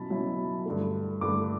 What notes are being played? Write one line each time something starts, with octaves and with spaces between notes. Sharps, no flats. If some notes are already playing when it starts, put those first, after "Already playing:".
Already playing: B2 F#3 C#4 E4 A5 B5
B2 F#3 C#4 E4
G2 D3 A3
G2 D3 A3 D6